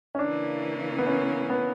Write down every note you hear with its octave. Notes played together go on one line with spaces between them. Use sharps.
C#4
C#3 E3 A#3 D4 E4 A#4
B3
C#4
B3